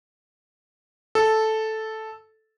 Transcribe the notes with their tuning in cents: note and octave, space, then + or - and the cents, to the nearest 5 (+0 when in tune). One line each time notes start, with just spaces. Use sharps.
A4 -5